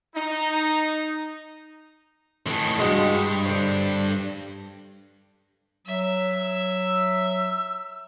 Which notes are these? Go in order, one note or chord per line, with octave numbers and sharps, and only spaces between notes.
D#4
A2 D#3 E3 A3 A4
C2 G2 G#3 F#4
D3 C4
F#3 E5
E6